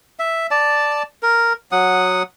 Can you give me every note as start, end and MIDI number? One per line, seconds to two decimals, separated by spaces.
0.19 0.47 76
0.51 1.03 74
0.51 1.03 81
1.23 1.53 70
1.72 2.23 54
1.72 2.23 78
1.72 2.23 87